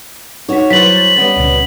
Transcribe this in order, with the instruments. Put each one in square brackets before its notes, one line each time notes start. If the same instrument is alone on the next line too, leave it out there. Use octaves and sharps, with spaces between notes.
[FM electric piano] D#4 B6 [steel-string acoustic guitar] F#4 C#5
[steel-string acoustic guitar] F#3 C5 [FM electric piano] E4 B4 A6 [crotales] B6 F#7
[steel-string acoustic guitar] G3 B3 C#4
[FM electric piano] C#2 A#2 C#3